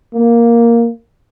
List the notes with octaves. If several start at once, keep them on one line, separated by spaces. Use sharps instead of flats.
A#3